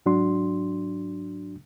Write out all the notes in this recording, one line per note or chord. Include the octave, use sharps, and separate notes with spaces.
G#2 F#3 D4 F#4 C6